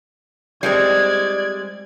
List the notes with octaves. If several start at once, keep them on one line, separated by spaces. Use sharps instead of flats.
G3 G#3 C4 D5 G#6